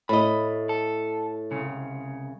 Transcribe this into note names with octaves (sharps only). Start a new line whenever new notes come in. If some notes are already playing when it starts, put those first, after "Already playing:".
A2 D#5 B5
A4
C2 C#3